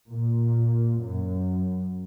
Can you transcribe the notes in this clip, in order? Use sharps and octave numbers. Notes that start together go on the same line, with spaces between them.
A#2
F#2